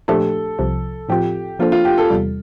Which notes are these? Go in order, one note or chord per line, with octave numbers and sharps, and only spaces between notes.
A#2 F3 A3 D4 G4 A4
C2 C3 F3
A2 F3 C4 F4 G4
F3 A#3 D4 F4 A4 C5
F4
G4
A4
E2 C3 G3